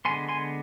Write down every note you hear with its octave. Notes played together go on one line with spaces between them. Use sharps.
D3 G#3 B3 G#5 C6
G#5 C6